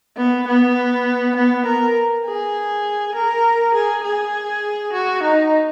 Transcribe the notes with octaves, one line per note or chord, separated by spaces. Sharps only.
B3
B3
B3
A#4
G#4
A#4
G#4
G#4
F#4
D#4